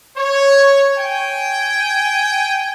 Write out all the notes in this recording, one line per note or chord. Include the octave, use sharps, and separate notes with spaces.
C#5
G5 G#5